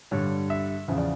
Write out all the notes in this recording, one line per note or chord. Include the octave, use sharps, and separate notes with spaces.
G2 D3 G3 C#5
E5
E2 C#3 F3 E5
D5